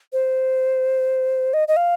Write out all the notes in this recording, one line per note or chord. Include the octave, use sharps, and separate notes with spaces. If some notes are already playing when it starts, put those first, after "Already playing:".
C5
D#5
D#5
F5